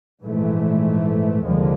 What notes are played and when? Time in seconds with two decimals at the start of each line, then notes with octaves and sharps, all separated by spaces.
0.24 A#1 G#2 E3 A3
1.44 F1 D#2 D3 F3 G#3